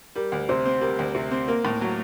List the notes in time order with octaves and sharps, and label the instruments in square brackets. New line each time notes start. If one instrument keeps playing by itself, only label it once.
[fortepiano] G3 [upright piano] A#4
[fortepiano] D2
[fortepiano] C3 [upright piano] C5
[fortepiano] C4
[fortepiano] G3 [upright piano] A#4
[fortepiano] D2
C3
C4
[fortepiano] A#3 [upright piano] A#4
[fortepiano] A2
F#3